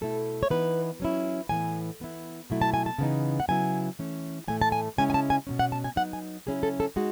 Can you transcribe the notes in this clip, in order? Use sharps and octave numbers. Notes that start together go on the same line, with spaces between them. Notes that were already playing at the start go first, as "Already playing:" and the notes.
B2 A3 E4 A4
C#5
E3 B3 D#4 B4
F#3 C#4 E4
A2 E3 B3 G#5
E3 B3 E4
B2 F#3 A3 E4
A5
G#5
A5
C#3 E3 B3 D#4
F#5
C#3 F#3 B3 E4 G#5
E3 A3 C#4
A2 E3 A3 G#5
A5
G#5
C#3 G#3 C#4 E4 G#5
G#5
A5
G#5
B2 F#3 C#4
F#5
A5
G#5
F#3 B3 D#4 F#5
G#5
C#3 F#3 C#4 E4 G#4
A4
A4
G#3 D#4 F#4